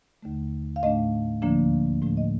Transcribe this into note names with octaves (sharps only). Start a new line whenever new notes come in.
D#2 D3 A3
F5
A2 A3 D4 D#5
D2 D3 F3 A#3 D4
A2 F3 A3 D4
D#5